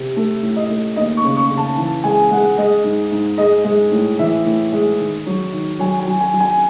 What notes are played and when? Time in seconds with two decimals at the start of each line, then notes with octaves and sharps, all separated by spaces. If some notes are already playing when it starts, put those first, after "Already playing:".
Already playing: C3
0.16 A3
0.42 A2
0.56 D#5
0.70 A3
0.96 D#2 D#5
1.17 C#6
1.23 C#3
1.37 C#6
1.50 C#3
1.57 A5
1.77 E3 A5
2.04 G#3 G#5
2.31 G#3 F#5
2.57 G#3 D#5
2.84 G#2
3.12 G#2
3.38 G#3 D#5
3.64 G#3
3.91 A2
4.18 E3 E5
4.46 A2
4.72 G#3
4.99 D#3
5.26 F#3
5.53 D#3
5.79 F#3 G#5
6.00 G#5
6.07 F#3
6.20 G#5
6.33 F#3
6.40 G#5